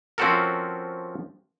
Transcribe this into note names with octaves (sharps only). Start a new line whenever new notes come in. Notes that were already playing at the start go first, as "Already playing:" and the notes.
F3 C4 C#4 F#4 A4 A#4